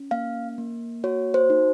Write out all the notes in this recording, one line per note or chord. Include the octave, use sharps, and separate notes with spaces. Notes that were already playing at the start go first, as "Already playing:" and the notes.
Already playing: C#4
A#3 F5
A#3
F#4 C#5
C5
D#4